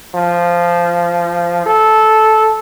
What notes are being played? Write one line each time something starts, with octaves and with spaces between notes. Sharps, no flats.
F3
A4